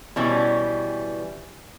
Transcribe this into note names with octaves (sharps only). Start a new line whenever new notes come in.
B2 E3 G3 C#4